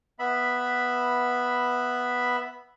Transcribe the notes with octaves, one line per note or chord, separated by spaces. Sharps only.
B3 E5 B5